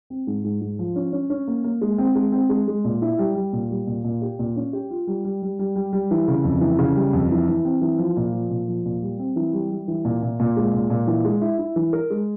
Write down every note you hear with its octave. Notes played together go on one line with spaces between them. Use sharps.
C4
G#2
G#2
G#2
F3
C#4
C#4
C#4
A#3
A#3
G#3
C4
G#3
C4
G#3
G#3
A#2
E4
G3
G3
A#2
G3
A#2
A#2
G4
A#2
C#4
G4
F4
G3
G3
G3
G3
G3
G3
E3
C#3
F2
E3
C#3
G3
F2
E3
E3
C4
E3
F3
A#2
F3
A#2
F3
A#2
G3
C4
E3
G3
G3
E3
A#2
A#2
A#2
G#3
A#2
A#2
E3
G#3
E4
E4
E3
A#4
G#3